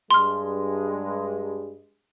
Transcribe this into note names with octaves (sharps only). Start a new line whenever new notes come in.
G2 G#3 C6 F6